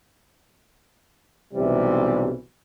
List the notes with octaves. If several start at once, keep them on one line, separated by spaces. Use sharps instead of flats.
B1 C3 E3 G3